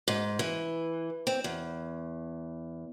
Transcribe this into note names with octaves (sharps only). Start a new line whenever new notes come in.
G#2
E3
C4
E2